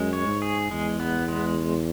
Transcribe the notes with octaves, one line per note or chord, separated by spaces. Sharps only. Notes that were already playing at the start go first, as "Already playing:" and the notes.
Already playing: F#2 G#3
C#5
G#2
G#4
E2 G#3
B3
G#3